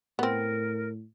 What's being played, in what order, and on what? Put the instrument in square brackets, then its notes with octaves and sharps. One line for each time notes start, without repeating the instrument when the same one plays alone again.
[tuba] A2 [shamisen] B3 C4 [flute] A#4